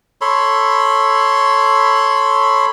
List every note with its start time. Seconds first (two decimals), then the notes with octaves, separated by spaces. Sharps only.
0.21 A4 C#5 B5 C6